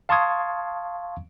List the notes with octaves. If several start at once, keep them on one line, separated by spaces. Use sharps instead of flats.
F5 A5 C6 C#6 D#6 G#6